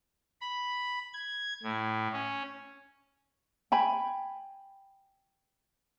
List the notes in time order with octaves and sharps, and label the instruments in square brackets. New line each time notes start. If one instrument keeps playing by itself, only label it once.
[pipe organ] B5
G#6
A2
C#4
[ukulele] G5 G#5 B5